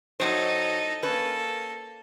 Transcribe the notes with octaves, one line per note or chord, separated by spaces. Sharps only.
A2 F#3 D#4 A4 C5
A#3 C#4 A4 B4